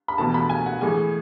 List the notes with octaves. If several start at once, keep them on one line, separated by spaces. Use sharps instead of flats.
B5
E2 B2 A3 A5
B5
G#5
F#5
A2 E3 G#3 G#5